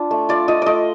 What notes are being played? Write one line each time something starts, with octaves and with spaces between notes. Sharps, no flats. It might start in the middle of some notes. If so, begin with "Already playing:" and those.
Already playing: D4 F4
A3
F4 D5
F4 D#5
A3 D5 D#5